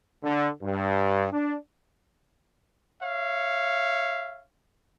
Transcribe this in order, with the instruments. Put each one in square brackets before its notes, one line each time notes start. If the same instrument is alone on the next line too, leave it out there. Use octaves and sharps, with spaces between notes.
[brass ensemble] D3
G2
D4
[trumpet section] C#5 E5 F5